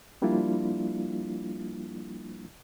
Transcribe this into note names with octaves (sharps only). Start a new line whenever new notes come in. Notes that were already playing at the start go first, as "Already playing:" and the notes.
F3 G3 A#3 D4 E4 F4